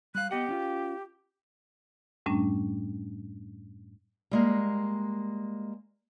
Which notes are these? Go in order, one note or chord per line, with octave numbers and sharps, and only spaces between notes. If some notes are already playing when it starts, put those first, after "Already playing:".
G3 F5 F#6
B3 G4 D#5 F#5
C#4 F4
F#2 A2 G3 A3 C#4 D4
G3 G#3 A#3